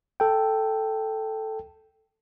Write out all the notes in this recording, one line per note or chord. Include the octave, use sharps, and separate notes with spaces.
A4 G5